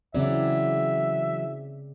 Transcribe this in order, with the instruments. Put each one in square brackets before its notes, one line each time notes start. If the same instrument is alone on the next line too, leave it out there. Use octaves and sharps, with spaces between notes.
[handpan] C#3 C4 D5 [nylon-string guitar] E3 F#3 [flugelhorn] E5